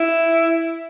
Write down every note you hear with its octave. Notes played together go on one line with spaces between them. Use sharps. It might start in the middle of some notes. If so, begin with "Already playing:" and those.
Already playing: E4